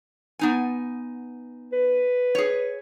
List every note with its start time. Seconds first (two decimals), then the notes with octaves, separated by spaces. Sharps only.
0.39 B3 D#4 G#5
1.73 B4
2.35 G#4 C#5